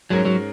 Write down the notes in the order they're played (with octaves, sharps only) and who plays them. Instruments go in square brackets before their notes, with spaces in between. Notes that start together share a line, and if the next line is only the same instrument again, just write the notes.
[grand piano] G#2 G#3 C#4 A#4 [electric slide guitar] F#3
[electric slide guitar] F#3